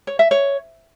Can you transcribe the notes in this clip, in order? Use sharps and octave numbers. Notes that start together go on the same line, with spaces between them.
C#5
E5
C#5